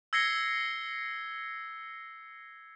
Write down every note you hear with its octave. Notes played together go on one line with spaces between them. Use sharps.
E6 G#6 A#6 C7 C#7 G7